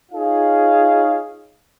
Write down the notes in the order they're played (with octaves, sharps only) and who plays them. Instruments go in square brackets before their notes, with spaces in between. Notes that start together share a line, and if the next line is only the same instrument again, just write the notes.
[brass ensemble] D#4 F4 G#4 C#5 F5